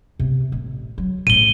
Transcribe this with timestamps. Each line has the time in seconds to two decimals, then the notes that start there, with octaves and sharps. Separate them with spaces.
0.19 C3 B3
0.52 A1
0.98 F#3
1.27 A2 C#3 D#7 G7